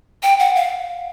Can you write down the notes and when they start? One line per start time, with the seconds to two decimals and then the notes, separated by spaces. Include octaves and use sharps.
0.23 G5
0.39 F#5
0.56 F5